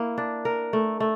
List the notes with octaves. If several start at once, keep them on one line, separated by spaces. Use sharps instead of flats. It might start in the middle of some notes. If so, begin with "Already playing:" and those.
Already playing: A#3 E4
D4
A#4
A3
A3